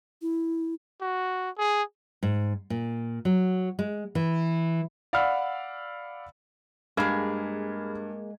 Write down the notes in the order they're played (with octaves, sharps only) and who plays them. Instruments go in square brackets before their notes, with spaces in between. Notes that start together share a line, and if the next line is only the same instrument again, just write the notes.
[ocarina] E4
[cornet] F#4
G#4
[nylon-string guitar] G#2
A#2
F#3
G#3
E3
[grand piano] D5 F5 F#5 B5 E6 F6
[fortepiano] G2 [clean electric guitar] G#3 [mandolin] A#3 G#4 [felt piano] B5 F6 G#6